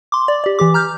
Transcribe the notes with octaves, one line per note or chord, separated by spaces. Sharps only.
C6 D6
D5
G4 D5
E3 G4 D6
A#5 F6 G6